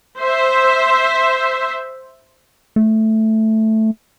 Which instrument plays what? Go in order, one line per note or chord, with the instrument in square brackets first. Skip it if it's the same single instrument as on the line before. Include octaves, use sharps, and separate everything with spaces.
[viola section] C5 E5
[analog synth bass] A3